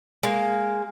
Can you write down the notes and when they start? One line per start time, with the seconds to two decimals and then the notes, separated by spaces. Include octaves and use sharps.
0.23 G#3 A#3